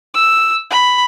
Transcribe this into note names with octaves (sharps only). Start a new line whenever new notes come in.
E6
B5